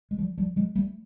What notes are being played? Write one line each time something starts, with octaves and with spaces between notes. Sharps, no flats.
G#3
F3 G3
F3 G3
F#3 G#3
G3 A3